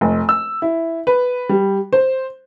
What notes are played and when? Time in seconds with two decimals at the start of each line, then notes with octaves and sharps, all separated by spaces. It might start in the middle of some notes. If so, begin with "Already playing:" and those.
0.01 F1
0.29 E6
0.62 E4
1.07 B4
1.49 G3
1.93 C5